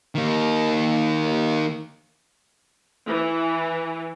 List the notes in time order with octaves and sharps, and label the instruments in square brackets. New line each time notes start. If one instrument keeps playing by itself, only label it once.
[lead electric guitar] D#3 A#3
[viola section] E3